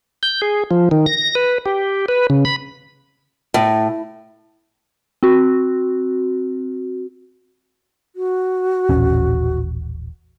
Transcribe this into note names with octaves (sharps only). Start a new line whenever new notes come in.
G6
G#4
F3
D#3
A#6
B4
G4
B4
C#3
B5
A2
C4 F#4
F#4
D#1 A1 C#4